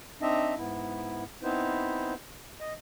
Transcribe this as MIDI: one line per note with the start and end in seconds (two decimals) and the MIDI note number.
0.22 0.54 60
0.22 0.54 62
0.22 0.54 63
0.22 0.54 75
0.22 0.54 76
0.58 1.24 44
0.58 1.24 59
0.58 1.24 64
1.43 2.14 59
1.43 2.14 60
1.43 2.14 63
1.43 2.14 64
1.43 2.14 71
1.43 2.14 72
2.60 2.73 75